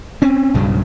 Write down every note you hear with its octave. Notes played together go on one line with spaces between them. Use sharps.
C4 C#4
B1 G2 C#3 F#3